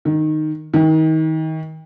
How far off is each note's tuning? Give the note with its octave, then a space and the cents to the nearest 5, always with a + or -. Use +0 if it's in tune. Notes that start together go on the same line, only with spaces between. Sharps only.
D#3 -10
D#3 +30